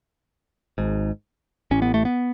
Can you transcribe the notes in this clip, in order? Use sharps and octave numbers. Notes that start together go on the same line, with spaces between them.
G#1 G#2
A1 A2 C#4
B3
A3
B3